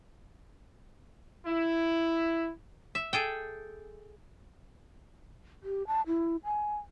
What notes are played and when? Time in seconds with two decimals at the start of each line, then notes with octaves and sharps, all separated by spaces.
1.46 E4
2.95 E5
3.13 G#4 A4 G5
5.64 G4
5.87 A5
6.07 E4
6.45 G#5